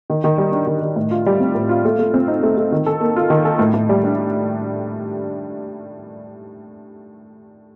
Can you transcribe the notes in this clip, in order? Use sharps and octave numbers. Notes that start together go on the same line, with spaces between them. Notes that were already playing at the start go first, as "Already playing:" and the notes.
D#3
D#3
G3
D4
D#3
D#3
A2
F4
G3
C4
A2
F4
A3
A3
C4
D#4
A3
A3
D#3
A4
A#3
F4
D#3
A4
A2
A2
G3
D4